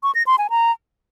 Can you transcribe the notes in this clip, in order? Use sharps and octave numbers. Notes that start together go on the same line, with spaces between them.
C#6
A#6
C6
G#5
A#5